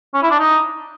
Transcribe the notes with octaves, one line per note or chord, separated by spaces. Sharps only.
C#4
E4
D4
D#4